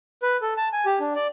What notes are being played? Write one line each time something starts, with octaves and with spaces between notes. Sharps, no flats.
B4
A4
A5
G#5
G4
D4
D5